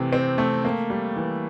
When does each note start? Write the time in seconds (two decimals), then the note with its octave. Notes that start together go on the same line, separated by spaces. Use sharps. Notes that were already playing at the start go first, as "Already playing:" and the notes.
Already playing: C3 E3 A3 C4
0.13 C4
0.38 A3
0.65 A#3
0.90 G3
1.16 E3